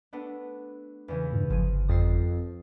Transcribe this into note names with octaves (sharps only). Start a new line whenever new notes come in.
A3 B3 D4
E2 C#3 E3
G2
G1 F3 G#4 D#7
F2 D#6 A6 C7